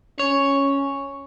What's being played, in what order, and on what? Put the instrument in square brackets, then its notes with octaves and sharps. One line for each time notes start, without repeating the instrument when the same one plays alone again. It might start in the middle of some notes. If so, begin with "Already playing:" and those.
[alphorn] C#4 [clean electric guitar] C#5